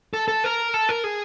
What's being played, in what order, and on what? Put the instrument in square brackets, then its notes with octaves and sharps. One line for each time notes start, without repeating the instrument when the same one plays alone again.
[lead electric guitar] A4
A4
A#4
A4
A#4
G#4